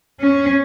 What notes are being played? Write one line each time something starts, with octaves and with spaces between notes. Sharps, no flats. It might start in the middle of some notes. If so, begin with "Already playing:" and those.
C#4